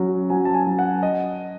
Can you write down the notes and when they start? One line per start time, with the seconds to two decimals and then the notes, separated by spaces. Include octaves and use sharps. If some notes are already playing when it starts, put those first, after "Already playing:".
Already playing: F#3 C#4
0.30 F#3 G#5
0.45 A5
0.54 G#5
0.67 F#3
0.79 F#5
1.03 D#5